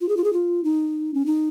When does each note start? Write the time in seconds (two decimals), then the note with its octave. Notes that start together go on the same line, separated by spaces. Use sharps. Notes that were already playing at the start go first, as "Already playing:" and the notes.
0.01 F4
0.09 G#4
0.17 F4
0.24 G#4
0.33 F4
0.64 D#4
1.14 C#4
1.26 D#4